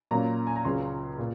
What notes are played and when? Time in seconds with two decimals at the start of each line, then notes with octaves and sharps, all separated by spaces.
0.11 A#2 F#3 A#3 C#4 A#5
0.47 G#5
0.56 A#5
0.65 C#2 C#3 F#3 C#4 F4 C6
1.18 A#2